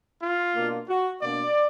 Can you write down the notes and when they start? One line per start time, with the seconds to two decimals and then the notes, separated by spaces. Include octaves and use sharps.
0.21 F4
0.54 B2 A#3 D4
0.89 F#4
1.22 B2 A#3 D4 D5